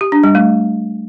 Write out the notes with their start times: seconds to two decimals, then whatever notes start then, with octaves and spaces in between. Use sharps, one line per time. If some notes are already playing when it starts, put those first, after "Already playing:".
0.01 G4
0.12 D4
0.24 G3
0.35 A3